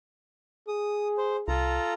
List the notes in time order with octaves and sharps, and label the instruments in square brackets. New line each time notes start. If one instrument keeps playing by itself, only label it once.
[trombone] G#4 [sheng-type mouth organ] D#6
[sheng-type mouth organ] C5
[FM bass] C2 [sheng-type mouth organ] F4 A4 A#5